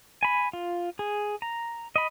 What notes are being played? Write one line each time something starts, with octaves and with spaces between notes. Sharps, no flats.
G#5 B5
F4
G#4
A#5
D#5 B5